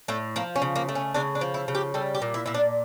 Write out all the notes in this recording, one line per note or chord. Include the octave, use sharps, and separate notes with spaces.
A2 A3
F3 A#3
C#4
C#3
A#3
A3
C#4
C#3 D4
D4
F3
E4
C#3
G4
G3 A4
G4
A#2
E4
A#2 E4
D4